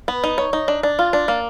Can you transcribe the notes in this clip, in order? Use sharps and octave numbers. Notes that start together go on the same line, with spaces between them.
B3
D#4
C#5
D#4
D4
D4
F4
D4
A#3